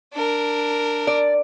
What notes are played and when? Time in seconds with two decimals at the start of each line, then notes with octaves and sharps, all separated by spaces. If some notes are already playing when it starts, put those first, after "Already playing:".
0.13 D4 A#4
1.07 D5